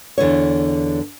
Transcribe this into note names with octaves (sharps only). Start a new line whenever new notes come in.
E2 D3 E4 C#5